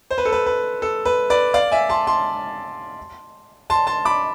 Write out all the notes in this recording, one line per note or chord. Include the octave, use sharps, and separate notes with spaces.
C5
B4
A4
B4
B4
A4
B4
B4 D5
D5 F5
E5 G#5
A5 C6
A5 C6
A5 C6
A5 C6
B5 D6